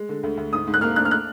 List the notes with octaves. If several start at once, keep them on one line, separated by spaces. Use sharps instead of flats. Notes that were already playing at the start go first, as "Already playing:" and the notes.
Already playing: G#3
D3
D2
D2
G#2 D#6
G#2
F#6
A#3 F6
D4 F#6
F6
F#6